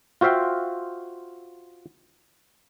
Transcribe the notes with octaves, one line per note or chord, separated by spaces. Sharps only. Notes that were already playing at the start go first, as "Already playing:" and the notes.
F4 F#4 C5 E5 F5 G5